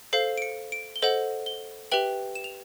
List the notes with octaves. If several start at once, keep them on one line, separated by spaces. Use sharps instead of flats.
A4 C5 F5 C7
D7
C#7
D7
G7
A4 C5 D#5 F#5 F#7
G7
G4 B4 E5 G5 F#7
E7
F7